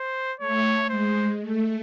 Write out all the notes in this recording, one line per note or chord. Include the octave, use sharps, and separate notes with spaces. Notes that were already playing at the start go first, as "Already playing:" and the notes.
Already playing: C5
A3 C#5
G#3 C5
A3